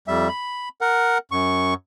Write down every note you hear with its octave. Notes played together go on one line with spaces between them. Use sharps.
F2 G3 E5
B5
A#4 F#5
F#2 C#6